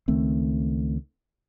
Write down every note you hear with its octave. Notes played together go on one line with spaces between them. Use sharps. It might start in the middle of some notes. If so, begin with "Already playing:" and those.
C#2 D#3 A3 C4